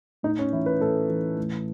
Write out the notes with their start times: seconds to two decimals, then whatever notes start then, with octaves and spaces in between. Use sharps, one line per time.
0.23 A2 D#4
0.39 C#4
0.52 E3 E4
0.66 B4
0.80 A2 A4
1.09 E3
1.37 A2